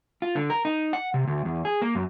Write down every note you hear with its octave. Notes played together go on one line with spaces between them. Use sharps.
F4
D3
A#4
D#4
F#5
C3
D2
E2
G#4
A#3
F#2